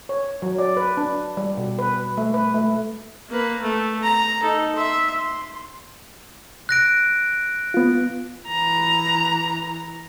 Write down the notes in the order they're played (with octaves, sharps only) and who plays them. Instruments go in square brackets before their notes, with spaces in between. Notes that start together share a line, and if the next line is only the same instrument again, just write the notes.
[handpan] C#5
F#3
D5
B4
D4
G3
B2
B4
A3
B4
A3
[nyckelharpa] A#3 B4
A3
A#5
D#4 A4
E5 C6
C6
[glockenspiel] F#6 A#6 D7
[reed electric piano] B3 F4
[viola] E3 A#5